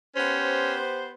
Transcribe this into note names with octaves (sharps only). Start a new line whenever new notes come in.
B3 C#4 G4 C5